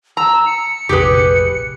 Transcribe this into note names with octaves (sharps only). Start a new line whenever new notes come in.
A#5 E6
C#7
F1 A#1 G4 G#4 B4